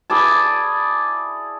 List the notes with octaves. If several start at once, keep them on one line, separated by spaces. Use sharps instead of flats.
E4 G#4 D5 A5